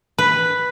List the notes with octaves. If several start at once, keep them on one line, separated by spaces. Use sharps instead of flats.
B4